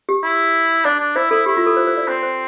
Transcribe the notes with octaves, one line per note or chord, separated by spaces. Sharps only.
G4
E4
D4 D5
D4
E4 C5
E4 A4
E4 G4
F4
A4
C5
C5
D5
C4 C5
C5